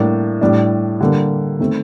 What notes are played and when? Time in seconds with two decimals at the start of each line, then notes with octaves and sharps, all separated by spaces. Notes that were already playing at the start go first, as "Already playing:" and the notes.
Already playing: A2 G3 A#3 D4
0.41 A2 G3 D4
1.01 D3 G3 A#3
1.59 D#3 A3 C4